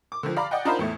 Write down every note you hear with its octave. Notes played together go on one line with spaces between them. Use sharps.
D6
D3 D#3 F3
D5 F5 A#5 B5 D6
D5 D#5 F#5 G5
D4 D#4 F4 A#4 C5 B5
E2 A2 A3